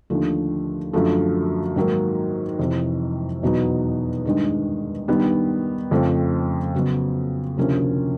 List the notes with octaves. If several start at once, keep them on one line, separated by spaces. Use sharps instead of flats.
D#2 D3 F3 A3
F#2 D3 F3 A3
G#2 D#3 F#3 A#3
F2 C3 E3
E2 B2 F#3 B3 D#4
G2 D#3 G#3
G2 D#3 G3 B3
F2 C#3 F3 A3 C4
C#3 F#3 B3
D2 C3 F3 A#3 C#4